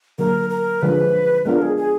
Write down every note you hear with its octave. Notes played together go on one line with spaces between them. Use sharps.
D3 F#3 A#3 A#4
A#4
D3 F3 G#3 B4
G#3 B3 D4 F4 A#4
G#4
G#4